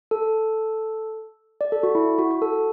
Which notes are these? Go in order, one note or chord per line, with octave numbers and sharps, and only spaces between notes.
A4
D5
A4
F#4
E4
F#4
F#4
A4